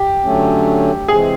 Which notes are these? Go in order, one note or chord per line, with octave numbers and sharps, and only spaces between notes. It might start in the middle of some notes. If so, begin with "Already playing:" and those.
Already playing: G4
D3 F#3 A3 C#4
C3 E3 G#3 C4 G#4